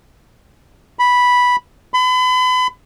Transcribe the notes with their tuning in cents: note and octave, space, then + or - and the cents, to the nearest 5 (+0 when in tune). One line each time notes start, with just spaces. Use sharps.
B5 -5
B5 +35